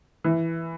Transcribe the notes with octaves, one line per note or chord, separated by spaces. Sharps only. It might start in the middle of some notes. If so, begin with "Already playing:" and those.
E3